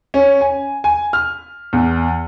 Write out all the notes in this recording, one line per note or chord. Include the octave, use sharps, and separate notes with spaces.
C#4
G#5
G#5
F6
E2